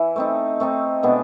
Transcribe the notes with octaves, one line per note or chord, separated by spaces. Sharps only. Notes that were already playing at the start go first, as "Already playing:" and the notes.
Already playing: E3 E4
A3 C4 D#4
A3 C4 D#4
B2 G#3 B3 D4